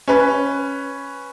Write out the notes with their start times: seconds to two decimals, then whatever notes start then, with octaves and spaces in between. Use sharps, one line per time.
0.08 C#4 B4